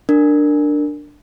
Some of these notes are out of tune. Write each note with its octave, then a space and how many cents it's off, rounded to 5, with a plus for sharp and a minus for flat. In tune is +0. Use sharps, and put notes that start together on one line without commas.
D4 +10 A#4 -10